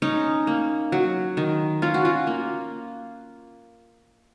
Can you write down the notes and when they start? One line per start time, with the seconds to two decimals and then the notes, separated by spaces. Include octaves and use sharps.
0.02 C#4 D#4
0.47 A#3
0.92 F#3
1.37 D#3
1.82 C#4 F4
1.94 F#4
2.05 F4
2.27 A#3